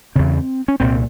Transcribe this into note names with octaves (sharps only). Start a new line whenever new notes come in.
E2 C#3 C4
C#4
C2 A#2 C4